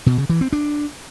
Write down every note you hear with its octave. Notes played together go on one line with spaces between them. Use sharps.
B2
C#3
E3
C4
D4